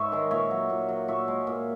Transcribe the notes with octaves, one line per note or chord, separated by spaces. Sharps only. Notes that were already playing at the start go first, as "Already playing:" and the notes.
Already playing: G#2 C#5 E5
D#3 G#3
A#2 C#5 E5
F#3
A#2
F#3
A#2 C#5 E5
G#3
A#2